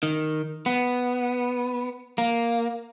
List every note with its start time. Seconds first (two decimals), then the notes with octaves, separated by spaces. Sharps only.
0.03 D#3
0.66 B3
2.18 A#3